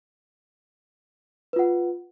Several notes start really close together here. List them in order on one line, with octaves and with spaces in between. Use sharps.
B4 F4 F#5